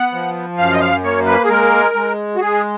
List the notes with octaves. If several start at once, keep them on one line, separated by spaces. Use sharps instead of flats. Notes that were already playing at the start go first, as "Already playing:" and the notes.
Already playing: B3 F#5
F3
F#2 F5
D#5
F5
A#3 C#5
B4
G#4
G#3 A#4
G#3
F#4
G#3 G#4